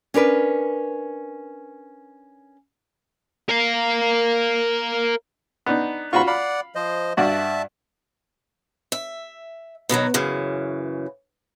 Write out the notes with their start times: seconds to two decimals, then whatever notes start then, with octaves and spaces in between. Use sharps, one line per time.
0.14 C#4 D4 A#4 B4
3.49 A#4 F5
5.66 B3 D4 D#4
6.13 E2 G#2 F4 F#4 B5 C#6
6.27 D5 F5 F#5 B5
6.75 F3 C5 D#5
7.17 G2 F#4 D5 E5 A5
8.92 E5
9.89 B2 D#3 E3 F#3
10.14 F#2 C#3 E3